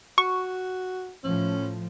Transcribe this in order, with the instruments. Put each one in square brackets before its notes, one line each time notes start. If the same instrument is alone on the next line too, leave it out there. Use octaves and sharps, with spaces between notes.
[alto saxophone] F#4 [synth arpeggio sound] C#6
[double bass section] A2 F3 [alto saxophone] C#4